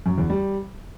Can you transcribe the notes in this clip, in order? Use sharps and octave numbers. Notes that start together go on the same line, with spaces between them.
F#2
E2
G3